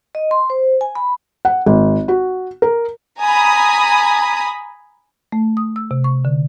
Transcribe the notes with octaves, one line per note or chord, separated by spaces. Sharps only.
D#5
C6
C5
G#5
B5
F#5
G#1
F#4
A#4
G#5 A#5 B5 D#6
A3
D#6
E6
C3
C#6
D3